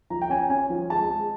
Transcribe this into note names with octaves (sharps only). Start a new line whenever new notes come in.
F3 A#5
G5
C#4 G#5
C#4 G#5
F3
G#3 A5
G#3